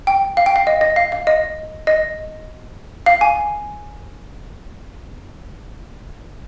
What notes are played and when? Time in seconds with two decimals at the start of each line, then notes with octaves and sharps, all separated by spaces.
0.07 G5
0.37 F5
0.46 G5
0.56 F5
0.67 D#5
0.81 D#5
0.96 F5
1.12 F5
1.27 D#5
1.87 D#5
3.06 F5
3.21 G#5